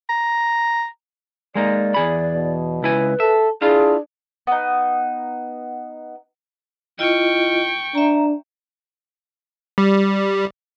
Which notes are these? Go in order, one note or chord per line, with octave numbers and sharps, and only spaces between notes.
A#5
G#3 A#3 D#4 D5
E2 G#4 B5
B2
C#2 E4 B4 G#5
A4 E5
D4 E4 F4 G#4 F5
B3 D#4
E4 F4 D#5 G5 C#6
D4 E5 A#5
G3